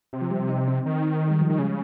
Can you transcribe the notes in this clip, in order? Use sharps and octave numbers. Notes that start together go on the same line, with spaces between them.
C3
F3
G3
D#4
C4
D#3
G#3
G3
F3
D#3 G3
C#3 G#3